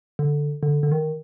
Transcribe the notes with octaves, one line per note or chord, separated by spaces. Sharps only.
D3
D3
D3
D#3